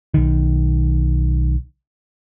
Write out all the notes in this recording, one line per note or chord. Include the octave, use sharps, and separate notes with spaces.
B1 D#3